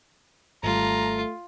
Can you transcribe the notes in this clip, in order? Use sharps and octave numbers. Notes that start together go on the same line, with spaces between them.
G#1 G3 A3 F4 A#5